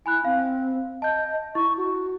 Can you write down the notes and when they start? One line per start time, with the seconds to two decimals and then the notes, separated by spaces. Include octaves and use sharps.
0.06 E4 G#5 B5 F#6
0.25 C4 F5
1.02 D#5 A5 G6
1.55 E4 C#6
1.77 F#4